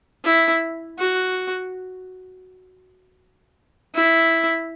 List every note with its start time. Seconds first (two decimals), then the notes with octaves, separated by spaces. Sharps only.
0.24 E4
0.98 F#4
3.94 E4